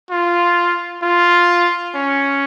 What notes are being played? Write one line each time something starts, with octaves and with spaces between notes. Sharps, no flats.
F4
F4
C#4